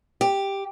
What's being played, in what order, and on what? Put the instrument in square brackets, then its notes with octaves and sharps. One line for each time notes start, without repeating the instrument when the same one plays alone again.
[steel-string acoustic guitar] G4